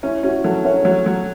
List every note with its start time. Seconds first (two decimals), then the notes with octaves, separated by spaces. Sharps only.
0.03 C#4 E4
0.23 C#4 F#4
0.44 F#3 A4
0.65 C#4 C#5
0.85 F#3
1.06 F#3